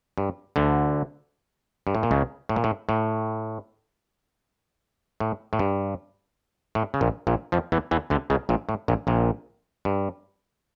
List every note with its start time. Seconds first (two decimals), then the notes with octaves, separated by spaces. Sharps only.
0.18 G2
0.56 D2 D3
1.87 G2
1.95 A2
2.03 A#2
2.11 C#2 C#3
2.49 A2
2.56 A#2
2.64 A2
2.89 A2
5.20 A2
5.53 A2
5.59 G2
6.75 A2
6.94 C#3
7.01 A#1 A#2
7.27 A#1 A#2
7.52 F2 F3
7.72 E2 E3
7.91 E2 E3
8.10 D2 D3
8.30 C#2 C#3
8.49 A#1 A#2
8.69 A2
8.88 A#1 A#2
9.07 A#1 A#2
9.85 G2